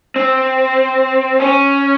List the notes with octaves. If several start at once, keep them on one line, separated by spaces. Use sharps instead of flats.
C4
C#4